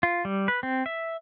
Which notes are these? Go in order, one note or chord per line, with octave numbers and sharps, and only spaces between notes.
F4
G3
B4
C4
E5